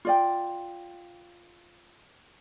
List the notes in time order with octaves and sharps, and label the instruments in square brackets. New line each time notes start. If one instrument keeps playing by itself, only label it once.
[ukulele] F4 D5 G5